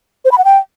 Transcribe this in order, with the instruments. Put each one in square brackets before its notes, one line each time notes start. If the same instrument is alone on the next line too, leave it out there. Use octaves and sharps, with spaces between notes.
[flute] C5
B5
F#5
G5